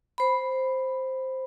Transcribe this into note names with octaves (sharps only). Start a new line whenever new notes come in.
C5 B5